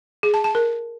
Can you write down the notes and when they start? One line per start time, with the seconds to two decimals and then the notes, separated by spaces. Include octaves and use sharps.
0.23 G#4
0.34 A5
0.44 A5
0.55 A#4